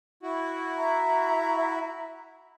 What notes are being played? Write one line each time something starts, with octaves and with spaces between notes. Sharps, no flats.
E4 F#4
E5 A#5